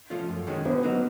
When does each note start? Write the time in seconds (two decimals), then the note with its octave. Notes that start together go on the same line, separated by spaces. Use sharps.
0.10 F3 A3 C#4 F4
0.29 F#2
0.47 D#3 G#3 C#4 F#4
0.65 D3 B3
0.83 F#3 A#3 D#4 F#4